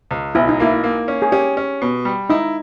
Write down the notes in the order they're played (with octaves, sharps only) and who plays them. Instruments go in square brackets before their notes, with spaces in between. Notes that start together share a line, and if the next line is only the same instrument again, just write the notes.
[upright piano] C#2
[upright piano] B1 [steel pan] E4
[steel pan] D#4
[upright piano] A#3 [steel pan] E4
[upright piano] A#3
C#4
[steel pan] G#4
[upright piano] C#4 [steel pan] G4
[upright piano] C#4
B2
G3
[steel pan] D#4 [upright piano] E4